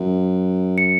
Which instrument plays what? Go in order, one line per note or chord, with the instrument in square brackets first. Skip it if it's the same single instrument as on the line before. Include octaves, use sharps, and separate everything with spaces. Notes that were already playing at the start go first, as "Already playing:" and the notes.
Already playing: [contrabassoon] F#2
[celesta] C#7